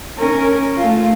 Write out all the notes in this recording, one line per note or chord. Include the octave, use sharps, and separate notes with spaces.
C#4 A#4
A3 F4